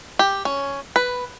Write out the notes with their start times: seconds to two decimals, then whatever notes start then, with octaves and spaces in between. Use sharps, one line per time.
0.19 G4
0.45 C#4
0.96 B4